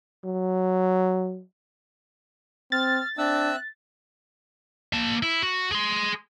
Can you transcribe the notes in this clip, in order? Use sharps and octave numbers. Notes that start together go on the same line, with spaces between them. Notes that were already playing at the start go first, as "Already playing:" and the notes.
F#3
C4 F6 A6
C4 D4 E5 E6 F#6
A#3 A5
E4
F#4
G#4 C6